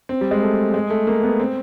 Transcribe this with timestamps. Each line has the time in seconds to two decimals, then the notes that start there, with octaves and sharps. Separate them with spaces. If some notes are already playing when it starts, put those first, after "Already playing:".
0.09 C4
0.21 G3
0.31 G#3
0.42 A3
0.74 G#3
0.90 A3
1.07 A#3
1.23 B3
1.39 C4